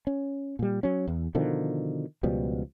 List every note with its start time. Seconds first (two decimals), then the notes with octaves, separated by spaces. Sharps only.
0.07 C#4
0.59 A#2 G3
0.83 F#3 C#4
1.08 E2
1.35 B2 D3 D#3 F3
2.23 C#2 B2 F3 G3